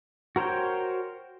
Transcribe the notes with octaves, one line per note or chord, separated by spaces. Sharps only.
F#4 A#4 C5 C#5 G5